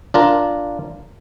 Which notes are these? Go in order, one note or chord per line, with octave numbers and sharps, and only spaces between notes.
D4 F4 A#4